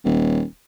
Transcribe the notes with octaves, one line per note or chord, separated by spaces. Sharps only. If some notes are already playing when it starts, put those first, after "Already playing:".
D#1